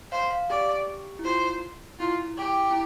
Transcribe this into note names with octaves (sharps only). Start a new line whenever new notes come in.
C5 F5
F5
G4 D5
E4
F4 C5
E4 F4
G4
E4